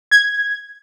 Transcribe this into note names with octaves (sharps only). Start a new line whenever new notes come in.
G#6